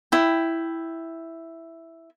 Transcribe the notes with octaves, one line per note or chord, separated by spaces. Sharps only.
E4 G5